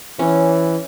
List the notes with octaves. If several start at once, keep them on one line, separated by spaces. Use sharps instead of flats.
E3 C#4